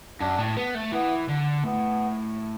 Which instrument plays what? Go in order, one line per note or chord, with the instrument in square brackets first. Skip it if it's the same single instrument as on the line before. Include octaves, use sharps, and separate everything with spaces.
[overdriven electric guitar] F#2 [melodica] D4
[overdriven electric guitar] A2
B3
A3
[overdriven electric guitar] E3 [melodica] B3
[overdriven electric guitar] D3
[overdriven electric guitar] A2 [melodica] B3